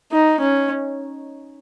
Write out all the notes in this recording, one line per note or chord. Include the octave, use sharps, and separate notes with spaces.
D#4
C#4